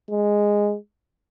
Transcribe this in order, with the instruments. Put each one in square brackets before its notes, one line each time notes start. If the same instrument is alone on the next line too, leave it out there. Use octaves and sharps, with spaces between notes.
[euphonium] G#3